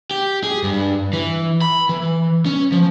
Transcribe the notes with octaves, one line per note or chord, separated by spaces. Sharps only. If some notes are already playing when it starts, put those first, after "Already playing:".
G4
G#4
G2
E3
B5
E3
C#4
F3